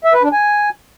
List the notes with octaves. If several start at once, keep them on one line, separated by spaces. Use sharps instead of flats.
E5
B4
D4
G#5